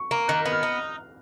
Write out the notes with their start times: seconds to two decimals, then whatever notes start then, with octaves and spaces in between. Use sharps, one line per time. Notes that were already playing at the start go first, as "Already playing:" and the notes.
Already playing: C#6
0.11 A#3
0.28 D#3 F#6
0.40 F6
0.45 B3
0.52 F6
0.63 D#4